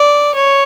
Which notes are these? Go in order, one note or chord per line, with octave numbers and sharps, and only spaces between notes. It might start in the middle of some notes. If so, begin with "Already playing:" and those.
Already playing: D5
C#5